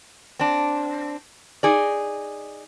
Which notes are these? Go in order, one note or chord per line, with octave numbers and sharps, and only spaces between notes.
C4 D4
D#4 G#4 D5